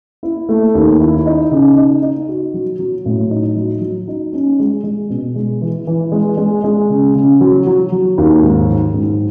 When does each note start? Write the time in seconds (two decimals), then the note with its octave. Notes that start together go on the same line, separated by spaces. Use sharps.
0.23 E4
0.49 A3
0.75 D#2
1.00 E4
1.26 D#4
1.51 C#3
1.77 D#4
2.02 D#4
2.29 F#4
2.54 F#3
2.79 F#3
3.06 A2
3.30 D#4
3.56 F#3
3.81 F#3
4.08 D#4
4.33 C#4
4.59 G#3
4.84 G#3
5.10 B2
5.36 G#3
5.62 E3
5.87 E3
6.12 G#3
6.37 G#3
6.64 G#3
6.90 C#3
7.15 C#3
7.41 F#3
7.66 F#3
7.92 F#3
8.18 D#2
8.43 G#2
8.68 F#3
8.94 G#2